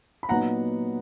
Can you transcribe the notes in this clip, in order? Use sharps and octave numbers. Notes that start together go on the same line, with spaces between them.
B5
A#2 F#3 B3 D#4 F#5 A#5